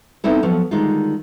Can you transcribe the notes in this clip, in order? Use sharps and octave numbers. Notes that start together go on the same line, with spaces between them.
B3 C4 D#4 E4 A4
F3 F#3 B3 A4
D3 D#3 G3 G#3 D#4 F4